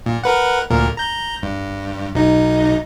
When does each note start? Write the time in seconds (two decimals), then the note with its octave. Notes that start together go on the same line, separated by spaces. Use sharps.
0.06 A#2
0.24 A#4 B4 F#5
0.70 D2 A#2 A#4
0.97 A#5 G6
1.43 G2
2.15 B1 D#4